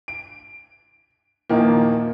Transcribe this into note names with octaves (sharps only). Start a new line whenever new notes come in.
D7
E2 A#2 D#3 F3 A#3